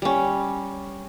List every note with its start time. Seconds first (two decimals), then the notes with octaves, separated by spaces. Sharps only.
0.02 G3 C#4